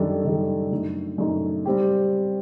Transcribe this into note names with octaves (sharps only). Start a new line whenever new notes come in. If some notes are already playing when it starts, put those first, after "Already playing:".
Already playing: F#2 D#3 G3 D4 A4
F#2 D#3 G3 D4 A4
F#2 D3 A3 D#4
F#2 D3 A3 D#4
G3 C4 G4